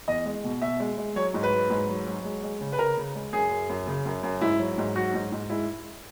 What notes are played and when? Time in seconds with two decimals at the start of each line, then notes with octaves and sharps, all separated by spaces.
0.08 E2 D#5
0.25 G#3
0.44 B2
0.62 B2 E5
0.80 G#3
0.97 G#3
1.16 F#3 C#5
1.34 G#2
1.43 B4
1.52 F#3
1.70 G#2
1.88 F#3
2.06 F#3
2.24 G#3
2.43 G#3
2.60 C#3
2.72 B4
2.79 C#3 A#4
2.97 C#3
3.15 G#3
3.33 F#2 G#4
3.51 F#2
3.69 F#2
3.87 C#3
4.05 F#2
4.23 F#2
4.41 G#2 E4
4.59 F#3
4.78 G#2
4.95 F#3 F#4
5.14 G#2
5.32 G#2
5.50 G#3 E4